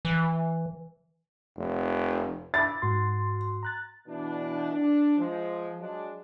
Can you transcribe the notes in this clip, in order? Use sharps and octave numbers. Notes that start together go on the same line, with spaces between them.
E3
F1
E5 B5 D6 A6
G#2 F#4 C6
A#5 F#6 A6
B2 E3 D4
D4
F3 G#3
F#3 G#3 D4